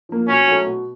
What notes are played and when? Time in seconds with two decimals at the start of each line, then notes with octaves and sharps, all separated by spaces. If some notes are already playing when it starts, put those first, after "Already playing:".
0.09 F3 A#3
0.28 B2 C#4
0.47 F#3 A3
0.66 B2